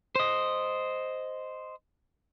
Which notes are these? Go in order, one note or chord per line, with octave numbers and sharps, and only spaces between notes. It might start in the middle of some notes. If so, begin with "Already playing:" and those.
C5 D#5